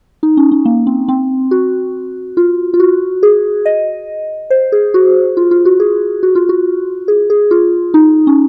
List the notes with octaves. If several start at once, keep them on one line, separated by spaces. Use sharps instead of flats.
D#4
C#4
C#4
A#3
C4
C4
F#4
F4
F4
F#4
G#4
D#5
C5
G#4
F#4
F4
F4
F#4
G#4
F#4
F4
F#4
G#4
G#4
F4
D#4
C#4